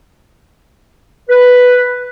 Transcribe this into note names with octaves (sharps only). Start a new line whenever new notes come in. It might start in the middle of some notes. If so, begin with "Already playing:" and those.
B4